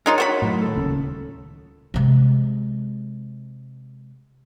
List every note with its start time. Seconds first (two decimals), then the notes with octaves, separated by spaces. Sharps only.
0.06 G#3 D#4 F4 A#4 C#5
0.18 F#4 C5 B5
0.42 A2 F#3
0.61 D#2 A4
0.75 D#1 C#2 C#3
1.94 C3 G#3